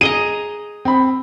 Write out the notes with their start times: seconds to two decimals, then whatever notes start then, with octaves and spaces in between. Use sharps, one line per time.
0.01 G#4 D#5 A#5 D#7
0.85 C4 B5